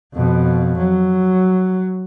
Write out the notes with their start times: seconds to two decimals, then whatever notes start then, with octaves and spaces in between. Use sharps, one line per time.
0.13 F2 B2
0.77 F#3